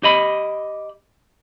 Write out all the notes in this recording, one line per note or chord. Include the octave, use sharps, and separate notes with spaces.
G4 D#5 B5